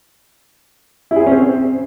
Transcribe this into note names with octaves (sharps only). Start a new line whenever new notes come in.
E4
G#4
C5
C#4
C4